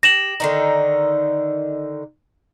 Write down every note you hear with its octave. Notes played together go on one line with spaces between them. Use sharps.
G4 A#6 E7 F#7
D3 D#3 D#4